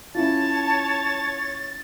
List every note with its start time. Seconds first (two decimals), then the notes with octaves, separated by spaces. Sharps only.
0.15 C#4 E4 F4 C#5 A5 A6